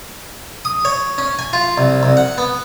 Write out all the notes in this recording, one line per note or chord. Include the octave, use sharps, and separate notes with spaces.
D#6
C#5
C#4
G#5
F4
C2
C2
F#5
B3